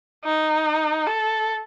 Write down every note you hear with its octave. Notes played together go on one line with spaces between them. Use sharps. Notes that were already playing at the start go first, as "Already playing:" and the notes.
D#4
A4